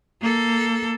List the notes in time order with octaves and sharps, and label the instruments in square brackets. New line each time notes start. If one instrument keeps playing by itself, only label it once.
[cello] A#3 A4